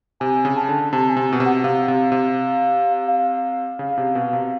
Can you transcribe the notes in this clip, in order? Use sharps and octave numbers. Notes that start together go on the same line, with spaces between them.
C3 G#5
C#3
A5
D3
C3 A5
G#5
C3
B2
C3
F#5
C3 F5
C3
C3
F5
C#3
C3
B2
C3